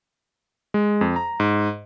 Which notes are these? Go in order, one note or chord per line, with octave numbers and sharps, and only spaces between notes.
G#3
F2
A#5
G#2